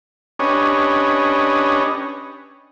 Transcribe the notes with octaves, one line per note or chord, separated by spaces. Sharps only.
C#4 D4 G4 B4 C#5 D#5